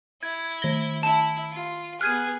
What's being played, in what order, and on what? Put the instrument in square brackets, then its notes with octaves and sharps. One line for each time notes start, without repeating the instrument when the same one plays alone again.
[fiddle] E4 [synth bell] G#6
[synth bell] D#3 G7 [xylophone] A#6
[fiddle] E4 [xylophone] A5
[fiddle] F4
[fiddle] B3 G#4 [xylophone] F6 G#6 D#7 [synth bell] F#6